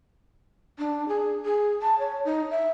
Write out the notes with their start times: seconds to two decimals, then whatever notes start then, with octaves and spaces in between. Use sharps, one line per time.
0.79 D4
1.08 G#4
1.45 G#4
1.82 A5
1.99 C#5
2.25 D#4
2.51 E5